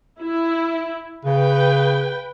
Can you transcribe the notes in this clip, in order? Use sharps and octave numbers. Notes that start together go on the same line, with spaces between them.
E4
C#3 B4 G5